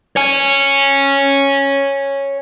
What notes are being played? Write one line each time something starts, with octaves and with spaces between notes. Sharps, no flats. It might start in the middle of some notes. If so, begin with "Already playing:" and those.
C#5 G#5